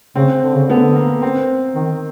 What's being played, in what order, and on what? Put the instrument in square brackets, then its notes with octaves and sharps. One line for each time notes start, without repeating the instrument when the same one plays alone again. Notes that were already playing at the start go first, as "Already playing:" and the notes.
[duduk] C#3 [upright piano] C4
[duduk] D3
C#3
[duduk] D3 [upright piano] B3
[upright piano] A#3
C4
[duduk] D#3